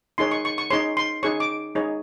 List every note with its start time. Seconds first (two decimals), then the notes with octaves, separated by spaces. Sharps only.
0.18 D#4 G#4 C#5 C6
0.31 C#6
0.45 C#6
0.58 C#6
0.71 D#4 G#4 C#5 C6
0.97 C6
1.23 D#4 G#4 C#5 C#6
1.40 D6
1.75 D#4 G#4 C#5